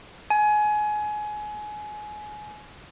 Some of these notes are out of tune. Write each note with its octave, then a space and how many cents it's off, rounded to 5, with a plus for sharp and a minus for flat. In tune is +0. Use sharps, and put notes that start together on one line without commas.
G#5 +25